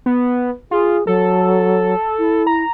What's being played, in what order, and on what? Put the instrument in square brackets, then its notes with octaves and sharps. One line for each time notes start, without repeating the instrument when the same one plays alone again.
[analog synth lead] B3
[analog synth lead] F4 [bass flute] G#4
[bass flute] F#3 [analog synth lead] A4
[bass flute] E4
[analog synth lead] A#5